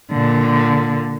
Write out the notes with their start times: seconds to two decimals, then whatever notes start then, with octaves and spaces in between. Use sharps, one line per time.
0.12 A#2 D3